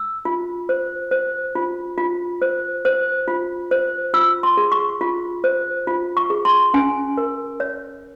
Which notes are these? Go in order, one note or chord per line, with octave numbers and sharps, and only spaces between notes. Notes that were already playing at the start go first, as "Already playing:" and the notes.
Already playing: E6
F4
C5
C5
F4
F4
C5
C5
F4
C5
F4 E6
C6
G#4
C#6
F4
C5
F4
C#6
G#4
C6
C#4 G#5
A#4
C#5